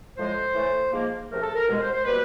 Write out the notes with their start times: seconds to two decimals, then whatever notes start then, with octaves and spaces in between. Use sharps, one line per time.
0.17 A2 F3 G#3 C5
0.55 A2 E3 A3
0.92 G#2 F3 A#3
1.29 C#2 C3 F3 A3 A#4
1.42 A4
1.55 A#4
1.67 C2 B2 G#3
1.79 C5
1.92 C5
2.04 B2 G3 A#3 B4